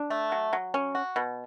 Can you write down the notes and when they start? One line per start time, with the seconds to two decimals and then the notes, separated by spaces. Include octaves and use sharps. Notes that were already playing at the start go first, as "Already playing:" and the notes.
Already playing: D4
0.10 A3
0.32 F#3
0.53 F#3
0.74 C#4
0.95 F#4
1.16 B2